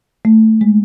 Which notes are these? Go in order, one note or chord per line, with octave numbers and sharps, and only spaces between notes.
A3
G#3